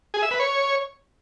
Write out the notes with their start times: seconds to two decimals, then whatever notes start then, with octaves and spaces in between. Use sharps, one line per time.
0.14 G#4
0.22 E5
0.31 B4
0.40 C#5